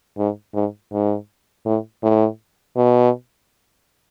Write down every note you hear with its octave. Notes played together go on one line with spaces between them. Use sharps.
G#2
G#2
G#2
A2
A2
B2